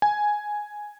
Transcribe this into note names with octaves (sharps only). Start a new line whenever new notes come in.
G#5